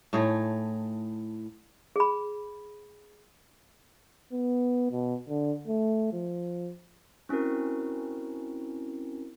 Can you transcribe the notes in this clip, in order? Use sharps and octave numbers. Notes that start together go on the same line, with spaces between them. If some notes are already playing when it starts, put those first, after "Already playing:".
A2 A3 D#4 G#4
G#4 B5
B3
B2
D3
A3
F3
C4 C#4 E4 F#4 A#4